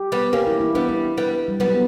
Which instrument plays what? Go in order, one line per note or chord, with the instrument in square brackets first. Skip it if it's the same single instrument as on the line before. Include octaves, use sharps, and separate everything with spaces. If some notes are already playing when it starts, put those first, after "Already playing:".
Already playing: [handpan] G4
[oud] G3 B3
[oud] A#3 C#4 [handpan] G4
[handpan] E4
E4
[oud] G3 B3 [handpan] D4
[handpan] E4
[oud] G3 B3
[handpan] G3
[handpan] F#3 [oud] G3 B3